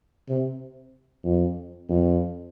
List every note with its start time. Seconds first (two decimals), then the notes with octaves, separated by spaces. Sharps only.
0.29 C3
1.25 F2
1.89 F2